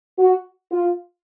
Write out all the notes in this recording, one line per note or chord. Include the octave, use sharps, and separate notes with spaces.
F#4
F4